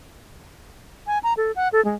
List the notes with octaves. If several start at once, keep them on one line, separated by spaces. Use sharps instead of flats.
G#5
A#5
A4
F#5
A4
G#3